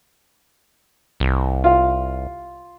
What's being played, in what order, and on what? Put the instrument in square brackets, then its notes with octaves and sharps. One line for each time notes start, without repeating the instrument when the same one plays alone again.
[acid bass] C2
[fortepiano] F4 F5